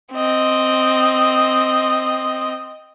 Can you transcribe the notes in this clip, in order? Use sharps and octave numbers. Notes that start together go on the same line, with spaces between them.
C4 D#5